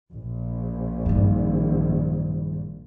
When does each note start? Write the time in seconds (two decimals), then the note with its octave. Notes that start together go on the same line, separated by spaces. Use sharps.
0.11 A#1
1.06 G2 D#3